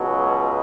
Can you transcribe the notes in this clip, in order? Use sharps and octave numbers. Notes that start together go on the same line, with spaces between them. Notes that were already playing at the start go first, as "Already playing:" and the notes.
Already playing: C#2 B2 F#3